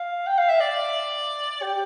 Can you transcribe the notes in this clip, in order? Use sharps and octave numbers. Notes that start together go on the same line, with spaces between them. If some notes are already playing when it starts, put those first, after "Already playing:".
Already playing: F5
G5
F5
E5
D5
G4